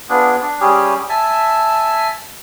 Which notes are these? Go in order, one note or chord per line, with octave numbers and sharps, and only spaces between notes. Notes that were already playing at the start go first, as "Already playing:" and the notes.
B3 D4 F4 G#4
D4
G3 C#4 G4 G#4
E5 G#5 A5